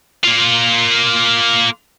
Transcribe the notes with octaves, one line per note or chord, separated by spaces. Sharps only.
A#3 F4